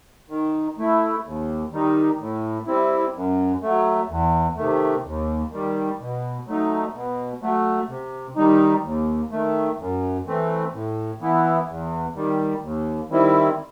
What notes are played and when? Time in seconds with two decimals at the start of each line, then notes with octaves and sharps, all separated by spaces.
0.30 D#3
0.78 A3 E4
1.25 D#2
1.72 D#3 G3 D#4
2.20 A2
2.67 G3 C4 E4
3.15 F#2
3.63 F#3 A3
4.09 E2
4.56 C3 D#3 A3
5.04 D#2
5.52 D#3 G3
6.00 B2
6.47 F#3 A3 D#4
6.94 B2
7.42 F#3 A3
7.89 C3
8.36 D#3 G3 D#4
8.83 D#2
9.31 D#3 A3
9.79 F#2
10.26 E3 A3 C4
10.73 A2
11.21 E3 B3 E4
11.68 E2
12.16 D#3 G3
12.63 D#2
13.10 D#3 G3 C4 E4